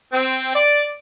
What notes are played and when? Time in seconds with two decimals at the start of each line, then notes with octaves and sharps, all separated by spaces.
0.12 C4
0.55 D5